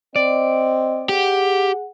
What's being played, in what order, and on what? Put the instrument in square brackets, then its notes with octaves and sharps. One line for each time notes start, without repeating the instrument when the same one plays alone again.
[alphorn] C4 [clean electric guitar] D5 [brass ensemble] D#5
[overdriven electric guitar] G4 [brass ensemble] G#4 F#5